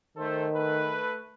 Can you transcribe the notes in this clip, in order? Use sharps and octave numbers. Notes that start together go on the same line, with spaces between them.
D#3 A3 A4 C5
A3 A4 B4